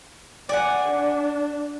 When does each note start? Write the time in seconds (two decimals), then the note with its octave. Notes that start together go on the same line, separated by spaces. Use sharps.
0.49 D5 F#5 G#5
0.89 D4